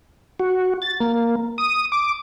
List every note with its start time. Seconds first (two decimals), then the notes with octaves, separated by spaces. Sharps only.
0.40 F#4
0.82 A6
1.00 A#3
1.58 D#6
1.92 D6